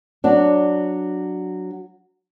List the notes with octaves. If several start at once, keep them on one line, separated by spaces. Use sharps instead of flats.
F#3 D4